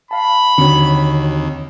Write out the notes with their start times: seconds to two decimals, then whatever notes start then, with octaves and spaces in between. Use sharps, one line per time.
0.11 F5 A5 B5
0.58 D#2 D3 C4 F#4 C#5